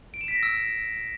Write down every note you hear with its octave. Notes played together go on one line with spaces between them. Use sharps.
D7
E7
B6
A#6
E6